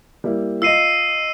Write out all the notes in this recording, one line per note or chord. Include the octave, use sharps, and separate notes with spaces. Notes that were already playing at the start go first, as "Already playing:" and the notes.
G3 A#3 E4
F4 D#5 E6 C7 D#7